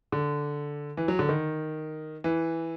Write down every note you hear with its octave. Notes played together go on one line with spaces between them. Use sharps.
D3
E3
F#3
D3
D#3
E3